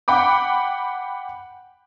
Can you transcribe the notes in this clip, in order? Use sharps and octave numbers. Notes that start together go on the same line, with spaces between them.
F#5 G5 B5 D6